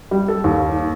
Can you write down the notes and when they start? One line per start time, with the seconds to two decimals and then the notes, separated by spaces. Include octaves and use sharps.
0.11 G3
0.28 A4
0.44 D#2